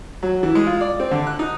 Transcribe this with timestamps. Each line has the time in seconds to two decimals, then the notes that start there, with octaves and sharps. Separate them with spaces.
0.23 F#3
0.43 E3
0.55 G#3
0.67 F4
0.81 D5
1.00 C4
1.11 D3
1.27 F#6
1.39 D#4